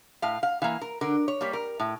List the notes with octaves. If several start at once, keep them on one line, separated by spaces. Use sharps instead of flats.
A2 F5
F5
E3 A#3 F5
A#4
D3 A#4
C#5
G3 A#3
A#4
A2